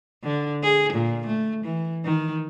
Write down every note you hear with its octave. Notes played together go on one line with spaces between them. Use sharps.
D3
G#4
A#2
A3
E3
D#3